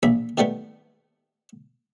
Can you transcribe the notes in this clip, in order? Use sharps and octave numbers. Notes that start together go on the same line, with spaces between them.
A#1 E5 B5
D#3 G3 A3 B3